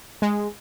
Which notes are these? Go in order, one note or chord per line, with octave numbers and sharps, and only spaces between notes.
G#3